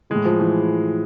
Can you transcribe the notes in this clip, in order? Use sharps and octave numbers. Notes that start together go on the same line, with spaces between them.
A2 E3 G#3
F3
E3